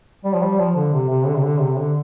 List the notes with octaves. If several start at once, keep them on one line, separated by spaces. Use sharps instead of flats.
G3
F3
G3
F3
D3
C3
C3
D3
C3
D3
C3
D3